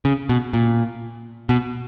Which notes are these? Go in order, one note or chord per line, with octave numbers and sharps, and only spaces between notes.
C#3
B2
A#2
B2